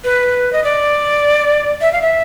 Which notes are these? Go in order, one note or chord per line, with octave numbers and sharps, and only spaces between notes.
B4
D#5
D5
E5
F5
E5